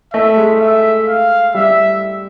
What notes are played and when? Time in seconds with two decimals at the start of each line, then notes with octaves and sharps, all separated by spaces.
0.13 A3 E5
0.37 G#3
0.60 E5
1.08 F5
1.54 G3 E5